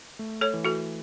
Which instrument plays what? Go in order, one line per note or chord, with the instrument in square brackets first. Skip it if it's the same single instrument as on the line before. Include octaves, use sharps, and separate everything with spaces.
[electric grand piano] A3
[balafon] A4 C#5
[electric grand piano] E3
[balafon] F#4 A4